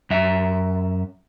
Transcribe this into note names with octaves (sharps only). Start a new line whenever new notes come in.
F#2 E5